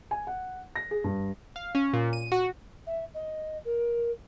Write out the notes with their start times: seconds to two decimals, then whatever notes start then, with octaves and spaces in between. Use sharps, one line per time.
0.11 G#5
0.27 F#5
0.76 A#6
0.91 G#4
1.04 G2
1.56 F5
1.75 C#4
1.93 A#2
2.13 D#7
2.32 F#4
2.86 E5
3.14 D#5
3.64 A#4